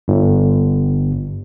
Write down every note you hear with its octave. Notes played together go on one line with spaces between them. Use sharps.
G1